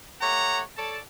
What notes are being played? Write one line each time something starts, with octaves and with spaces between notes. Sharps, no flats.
A3 G4 C#5 F#5 A#5
A4 C#5 D5 A5